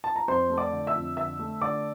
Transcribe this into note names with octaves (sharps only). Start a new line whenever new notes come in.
A5
A#5
F2 C5 C6
A3
D5 D6
D3
E5 E6
F2
D3 E5 E6
A3
D3 D5 D6